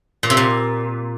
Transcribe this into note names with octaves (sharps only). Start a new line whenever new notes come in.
A#2
C3
A#2